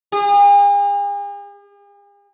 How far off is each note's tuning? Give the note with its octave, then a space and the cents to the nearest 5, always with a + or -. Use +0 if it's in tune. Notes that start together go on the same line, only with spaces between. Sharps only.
G#4 -45